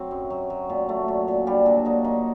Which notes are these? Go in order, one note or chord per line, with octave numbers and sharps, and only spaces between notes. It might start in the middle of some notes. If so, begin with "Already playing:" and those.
Already playing: F#3 C4 F#4
F#2
F#3
F#3
A#2
A3
A#2
A#2
G3 D4 G4
A#2 F#3 F#4
A#2 D#4
A#2 D#4